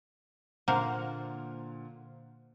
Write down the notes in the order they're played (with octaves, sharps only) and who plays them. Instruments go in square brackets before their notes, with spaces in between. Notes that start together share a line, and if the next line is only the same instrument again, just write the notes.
[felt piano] A#2 D3 F6 [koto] A#3 [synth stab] C5 F5 F#5